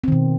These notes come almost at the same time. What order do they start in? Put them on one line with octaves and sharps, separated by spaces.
C4 D#3 B2